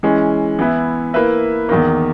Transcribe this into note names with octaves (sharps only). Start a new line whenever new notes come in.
E3 G#3 C#4
E3 B3 E4
A#3 E4 B4 E5
E2 D#3 A#3